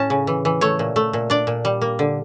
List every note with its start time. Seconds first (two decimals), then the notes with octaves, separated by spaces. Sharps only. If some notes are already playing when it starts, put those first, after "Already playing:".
Already playing: A2 C#4 A5
0.10 C#3
0.27 E3
0.45 E3
0.61 A3 C#5
0.79 A#2
0.96 A3
1.13 A#2
1.30 D4 D5
1.47 A#2
1.65 G3
1.81 A#3
1.99 D3